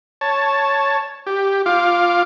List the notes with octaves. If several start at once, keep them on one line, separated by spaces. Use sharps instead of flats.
C#5 A5
G4
F4 F5 D6